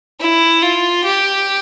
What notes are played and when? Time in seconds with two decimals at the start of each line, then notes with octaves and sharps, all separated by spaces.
0.20 E4
0.62 F4
1.05 G4